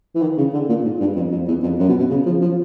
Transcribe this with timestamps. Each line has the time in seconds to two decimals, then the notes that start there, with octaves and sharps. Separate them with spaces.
0.15 E3
0.22 D#3
0.38 C#3
0.53 D3
0.69 A#2
0.84 G#2
1.00 G2
1.16 F2
1.31 F2
1.48 E2
1.63 F2
1.79 F#2
1.89 B2
1.99 B2
2.10 C#3
2.26 F3
2.41 F3